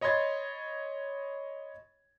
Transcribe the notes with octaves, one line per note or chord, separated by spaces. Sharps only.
C#5 D#5 B5 C6 G#6 A6